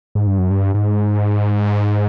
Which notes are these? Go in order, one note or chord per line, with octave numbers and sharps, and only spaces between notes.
G#2
G2
F#2
G2
G#2